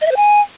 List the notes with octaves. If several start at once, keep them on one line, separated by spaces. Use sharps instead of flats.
D#5
E5
C5
G#5